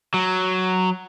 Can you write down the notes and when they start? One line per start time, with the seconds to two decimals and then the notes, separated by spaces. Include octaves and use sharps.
0.14 F#3